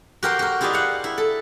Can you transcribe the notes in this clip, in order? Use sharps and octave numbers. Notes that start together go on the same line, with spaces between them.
F#4 G4 A#4 C5 G5
F#4 A#4
E4 F4 G4 G#4 D5 D#5
F5 F#5
E4
A4